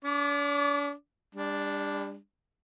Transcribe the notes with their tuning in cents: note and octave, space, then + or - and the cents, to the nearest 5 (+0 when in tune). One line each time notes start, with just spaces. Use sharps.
D4 -45 D5 -45 D6 +0
G3 +40 D4 +0